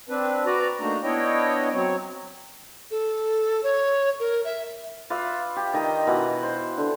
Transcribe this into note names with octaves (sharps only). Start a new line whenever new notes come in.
C4 D4 B4
F#4 B4 D5 A#5
A3 A#3 D4 D#4 F#4 A#5
B3 D4 E4 C#5 D#5 G5
F#3 C4 C#5
A4
C#5
A#4
E5
F4 B4 D5 E5
G4
D#3 D#5 G5 A#5
B2 E3 F#5
C5
D3